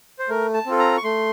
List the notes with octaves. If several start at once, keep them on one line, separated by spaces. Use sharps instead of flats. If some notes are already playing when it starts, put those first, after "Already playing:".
C5
A3 A#4
A5
C4 F4 A4
A#5
C#6
A3 C6